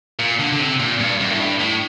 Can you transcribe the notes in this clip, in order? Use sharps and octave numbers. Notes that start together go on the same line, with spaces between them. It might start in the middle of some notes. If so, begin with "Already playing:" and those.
A#2
D3
D3
C3
A#2
G2
F#2
A2
G2
A2